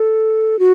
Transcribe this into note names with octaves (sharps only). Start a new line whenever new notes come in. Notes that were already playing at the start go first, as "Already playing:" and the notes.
Already playing: A4
F#4